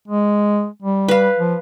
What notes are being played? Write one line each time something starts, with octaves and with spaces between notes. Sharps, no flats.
G#3
G3
B4 F5
F3